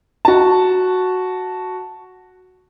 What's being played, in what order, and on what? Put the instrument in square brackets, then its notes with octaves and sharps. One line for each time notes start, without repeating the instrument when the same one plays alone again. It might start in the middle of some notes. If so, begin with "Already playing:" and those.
[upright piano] F#4 A5